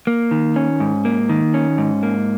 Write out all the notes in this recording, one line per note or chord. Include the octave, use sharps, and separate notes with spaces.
A#3
D#3
C#4
G#2
A#3
D#3
C#4
G#2
A#3